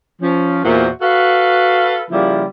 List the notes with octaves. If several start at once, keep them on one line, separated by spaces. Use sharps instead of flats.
F3 C#4
E2 A#2 A#3 F#4 C5 E5
F#4 A4 B4 F5
C#3 F3 G3 A#3 E4